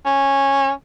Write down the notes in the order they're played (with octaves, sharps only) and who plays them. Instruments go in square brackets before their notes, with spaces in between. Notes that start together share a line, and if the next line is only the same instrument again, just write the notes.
[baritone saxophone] C#4